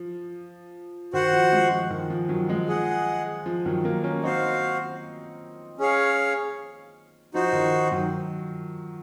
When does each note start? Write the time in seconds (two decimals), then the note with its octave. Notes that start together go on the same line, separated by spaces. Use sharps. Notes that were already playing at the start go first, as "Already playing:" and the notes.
Already playing: F3
1.13 D#3 F#4 C5 F#5
1.33 F3
1.53 F3 G#3
1.71 F3
1.90 D#3
2.10 F3
2.29 D#3 F#3
2.49 F3 G#3
2.68 G#4 D#5 F#5
3.46 F3
3.66 D#3 F#3
3.84 F#3 A#3
4.04 A#3 C#4
4.23 C4 D#4 F#4 C5 F5
5.78 C#4 G#4 C#5 F5
7.34 F3 D#4 F#4 C5
7.53 D#3
7.92 D#3 F#3